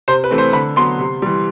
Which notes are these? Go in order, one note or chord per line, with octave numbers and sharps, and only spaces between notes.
C3 C5
B4
E3 A3 C4
C5
D3 B5
F#3 B3 C6
C3
E3 G3